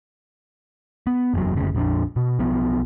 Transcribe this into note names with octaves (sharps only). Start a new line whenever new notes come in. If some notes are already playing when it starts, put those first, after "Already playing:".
B3
F#1 E2 F#3
F#1 D2 C#3
A#1 F2 C#4 D4
B2
B1 F3 B3